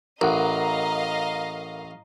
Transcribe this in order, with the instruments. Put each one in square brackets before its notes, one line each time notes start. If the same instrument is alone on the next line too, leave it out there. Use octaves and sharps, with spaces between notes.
[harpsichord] A1 [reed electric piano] A#4 F#5 [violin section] D#5 F5 A#5